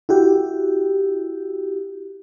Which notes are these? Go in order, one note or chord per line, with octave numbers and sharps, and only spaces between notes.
E4 F#4 G4